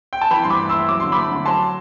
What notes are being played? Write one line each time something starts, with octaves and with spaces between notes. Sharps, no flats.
G5
A5
E3 G5 B5
G2 C6
B5 D6
A3
C6 E6
E4
F#3 D6
D3 C6
A3 B5 D6
D3
F#3 A5 C6